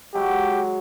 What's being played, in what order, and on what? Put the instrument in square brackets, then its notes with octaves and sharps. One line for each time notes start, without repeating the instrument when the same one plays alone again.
[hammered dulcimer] F#3 G#3 [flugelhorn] G4